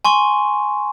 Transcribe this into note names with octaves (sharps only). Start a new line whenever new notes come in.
G#5 C6 C#6